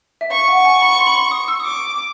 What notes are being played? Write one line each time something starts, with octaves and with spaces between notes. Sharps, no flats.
E5
F5 C#6
F#5
G#5
B5
C6
B5
C6
D#6
E6
D#6
D6 E6